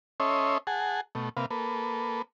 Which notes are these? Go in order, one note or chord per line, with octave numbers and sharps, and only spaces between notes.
C#4 A4 C#5 D#5 E5 C6
G#4 F#5 G#5 A5
B2 A3
C3 A#3 B4 F5
A#3 A4 B4